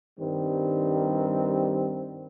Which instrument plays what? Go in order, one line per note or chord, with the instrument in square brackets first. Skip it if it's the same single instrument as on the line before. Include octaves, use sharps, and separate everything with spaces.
[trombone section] G2 D#3 G3 C4